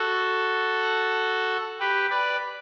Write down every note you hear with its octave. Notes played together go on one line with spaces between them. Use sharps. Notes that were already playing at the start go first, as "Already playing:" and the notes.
Already playing: F#4 A4
G4 B4
B4 D5